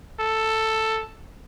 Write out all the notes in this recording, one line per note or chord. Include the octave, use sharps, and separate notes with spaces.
A4